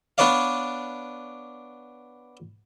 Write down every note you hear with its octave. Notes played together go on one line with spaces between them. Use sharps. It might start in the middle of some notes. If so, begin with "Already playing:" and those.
B3 D4 B4 C#5 D5 F5